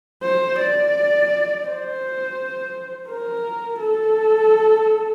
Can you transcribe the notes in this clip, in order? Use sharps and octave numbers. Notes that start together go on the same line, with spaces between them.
C5
D5
C5
A#4
A4